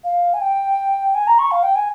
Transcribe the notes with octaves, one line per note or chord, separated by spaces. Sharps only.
F5
G#5
G5
G#5
A#5
C#6
F5
G5
G#5